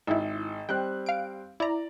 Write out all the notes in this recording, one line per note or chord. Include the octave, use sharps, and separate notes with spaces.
G#1 E4 E5
G3 C4 G5 F#6
F5 D7
E4 D5 A#5